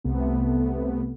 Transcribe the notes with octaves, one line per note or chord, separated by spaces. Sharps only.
C2 C3 A3 B3